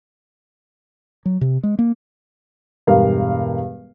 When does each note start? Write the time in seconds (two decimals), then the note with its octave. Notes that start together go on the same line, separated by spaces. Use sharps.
1.26 F#3
1.41 C3
1.63 G#3
1.79 A#3
2.87 E1 G2 A#4 F5